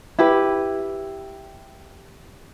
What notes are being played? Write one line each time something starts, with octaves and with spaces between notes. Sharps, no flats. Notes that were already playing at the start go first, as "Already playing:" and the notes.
E4 G4 B4